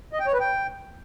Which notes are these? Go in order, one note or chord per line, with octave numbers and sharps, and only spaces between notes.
D#5
G5
C#5
B4
G5